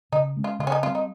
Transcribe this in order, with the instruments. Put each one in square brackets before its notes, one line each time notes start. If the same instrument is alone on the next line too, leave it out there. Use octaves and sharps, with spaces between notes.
[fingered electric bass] C#3 [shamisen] D#4
[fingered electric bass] G#3 C#4
[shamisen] F4
[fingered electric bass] C#3 [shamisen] F4
[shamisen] C#4
D#4
[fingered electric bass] G3 C4 [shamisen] F4
[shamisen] D#4